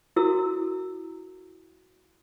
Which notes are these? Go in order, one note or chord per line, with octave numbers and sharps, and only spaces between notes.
E4 F#4 A4 A#4 E6